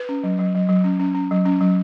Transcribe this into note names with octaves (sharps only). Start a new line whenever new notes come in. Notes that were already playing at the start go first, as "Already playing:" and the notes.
Already playing: B4
C#4
F#3
F#3
F#3
F#3
C#4
C#4
C#4
F#3
C#4
F#3